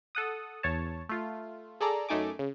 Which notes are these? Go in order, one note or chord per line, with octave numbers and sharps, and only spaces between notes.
A4 F#5 D#6
E2 C#5 A5
A3 F4
G#4 A4 D5 A#5
F#2 A3 D#4 G#5 D6
C#3